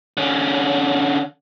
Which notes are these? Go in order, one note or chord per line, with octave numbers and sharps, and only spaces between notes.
D3 C#4